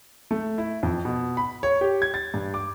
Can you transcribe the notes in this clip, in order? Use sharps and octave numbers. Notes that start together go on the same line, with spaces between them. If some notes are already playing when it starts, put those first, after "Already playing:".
A3
E4
F2
B2
B5
C#5
G4
G#6
A6
G2
D6